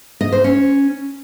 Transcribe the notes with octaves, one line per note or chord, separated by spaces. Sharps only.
D#5
C5
C#4